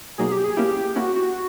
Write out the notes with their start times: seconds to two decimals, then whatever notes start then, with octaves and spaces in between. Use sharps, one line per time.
0.18 B2 F#3 A#3 D#4 G#4
0.32 G4
0.44 G#4
0.57 A#3 C#4 E4 G4
0.96 A#3 C#4 E4 F#4
1.16 F#4